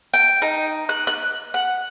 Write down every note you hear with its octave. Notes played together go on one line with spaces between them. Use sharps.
G5
D#4
F#6
F#6
F#5